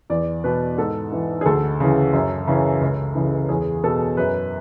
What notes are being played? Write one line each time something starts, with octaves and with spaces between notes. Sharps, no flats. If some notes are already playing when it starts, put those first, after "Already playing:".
E2 D5
B2 B4
G#2 A4
E3
G#4
D2 A4
C#3 E3
F#2
C#3 E3
C#2
C#3 E3
E2 G#4
B2 A4
F#2 B4